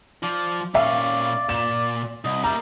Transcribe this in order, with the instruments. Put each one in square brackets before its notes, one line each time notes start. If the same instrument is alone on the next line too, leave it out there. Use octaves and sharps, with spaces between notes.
[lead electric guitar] F3 [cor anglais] D5
[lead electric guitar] A#2 C#4 [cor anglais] D5 [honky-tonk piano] E5 F5
[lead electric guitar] A#2 [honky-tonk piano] E7
[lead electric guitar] C2 [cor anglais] D#5
[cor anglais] G3 [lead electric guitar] A#3 E5 [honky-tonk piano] A#5